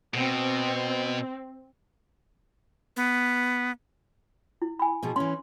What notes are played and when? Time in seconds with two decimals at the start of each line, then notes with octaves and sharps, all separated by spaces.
0.14 B2 C4
2.96 B3
4.62 E4
4.79 G#5 B5
5.03 B2 F3 G#4
5.16 E3 C#4 C6